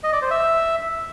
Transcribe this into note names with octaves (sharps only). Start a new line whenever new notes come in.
D#5
D5
C5
E5